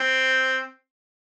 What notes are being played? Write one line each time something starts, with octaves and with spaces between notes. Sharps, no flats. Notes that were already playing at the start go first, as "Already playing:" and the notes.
Already playing: C4